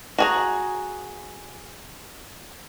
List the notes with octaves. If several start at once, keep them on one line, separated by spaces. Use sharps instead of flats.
F#4 G#4 A#5